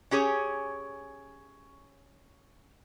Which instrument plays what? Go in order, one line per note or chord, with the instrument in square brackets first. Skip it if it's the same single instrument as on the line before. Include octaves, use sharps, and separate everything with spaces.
[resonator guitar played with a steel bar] C#4 G4 G#4 C#5